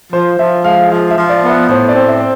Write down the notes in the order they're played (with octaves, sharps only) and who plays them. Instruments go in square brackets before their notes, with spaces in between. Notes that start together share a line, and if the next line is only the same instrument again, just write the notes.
[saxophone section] F3 [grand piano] C5
[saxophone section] F3 [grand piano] E5
[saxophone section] G#3 [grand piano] F5
[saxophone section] F3 [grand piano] F5
[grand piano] E5
[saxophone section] F3
[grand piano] D5
[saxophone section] B3
[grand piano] E5
[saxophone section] A2 [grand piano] C5
[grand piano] D5
[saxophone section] C4
[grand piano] E5